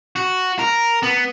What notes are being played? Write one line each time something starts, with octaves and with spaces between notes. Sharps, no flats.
F#4
A#4
B3